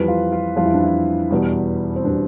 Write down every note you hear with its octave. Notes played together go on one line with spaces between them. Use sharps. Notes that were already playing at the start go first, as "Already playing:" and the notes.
Already playing: F2 E3 G3 B4
F4
F4
F2 E3 G3 F4
E4
D4
E4
E2 B2 G3
C4
B2 G3 D4